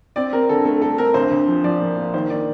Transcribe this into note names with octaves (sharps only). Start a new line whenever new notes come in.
C4 D5
C4 A#4
D3 A4
A3 A4
G2 A4
C4 A#4
D2 C5
D2
F3
F3 D5
A#3
A#3
D#3 C5
D#3 D5